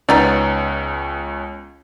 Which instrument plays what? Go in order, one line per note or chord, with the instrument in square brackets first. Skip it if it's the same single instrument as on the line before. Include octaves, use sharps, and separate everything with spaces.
[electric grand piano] C#2 C#4 [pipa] B3 D#4 D5